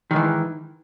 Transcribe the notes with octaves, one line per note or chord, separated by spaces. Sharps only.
G#2 D#3 E3